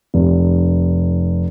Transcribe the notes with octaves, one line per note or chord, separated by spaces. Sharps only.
F1